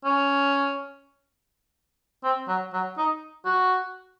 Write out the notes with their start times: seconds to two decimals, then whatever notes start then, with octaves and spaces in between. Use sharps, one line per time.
0.05 C#4
2.24 C4
2.48 F#3
2.73 F#3
2.98 D#4
3.45 F#4